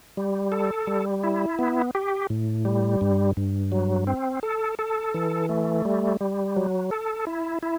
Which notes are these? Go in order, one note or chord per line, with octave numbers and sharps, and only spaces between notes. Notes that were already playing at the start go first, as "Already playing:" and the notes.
G3
A4
G3
E4
B3
G4
A2
G3
G2
G2
F#3
C4
A4
A4
E3
A3
G3
G3
F#3
A4
E4
E4